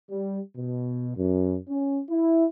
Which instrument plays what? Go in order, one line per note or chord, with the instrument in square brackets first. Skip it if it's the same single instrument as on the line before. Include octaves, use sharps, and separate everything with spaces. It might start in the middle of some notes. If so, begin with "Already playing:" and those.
[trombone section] G3
B2
F#2
C#4
E4